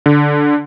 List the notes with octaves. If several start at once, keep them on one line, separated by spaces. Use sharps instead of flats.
D3